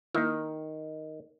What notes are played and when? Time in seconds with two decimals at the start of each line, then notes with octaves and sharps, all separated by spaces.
0.15 D#3 A#3 E4